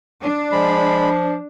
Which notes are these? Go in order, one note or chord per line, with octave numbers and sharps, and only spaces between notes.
D4
F3 G#3 B5